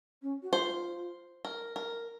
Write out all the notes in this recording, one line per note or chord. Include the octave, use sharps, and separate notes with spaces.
C#4
F#4
F4 C5
A#4
A#4